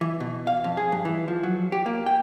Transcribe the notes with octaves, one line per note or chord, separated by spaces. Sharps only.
E3
B2
F5
F2
G#4
G2
E3
F3
F#3
G4
A#3
G5